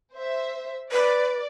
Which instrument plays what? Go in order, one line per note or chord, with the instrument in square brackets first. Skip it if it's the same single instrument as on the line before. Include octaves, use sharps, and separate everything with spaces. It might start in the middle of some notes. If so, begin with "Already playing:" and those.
[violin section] C5 E5
[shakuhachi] B4 [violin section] D5